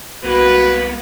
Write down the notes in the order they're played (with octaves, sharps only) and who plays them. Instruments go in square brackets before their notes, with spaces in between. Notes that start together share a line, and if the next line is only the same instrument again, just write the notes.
[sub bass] C2 [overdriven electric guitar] A#3 B3 [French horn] F#4 [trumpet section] B4